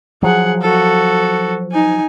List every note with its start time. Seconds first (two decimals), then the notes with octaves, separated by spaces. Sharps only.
0.23 F3 F#3 G#4 F#5
0.62 F#4 A4
1.72 D#4 G#5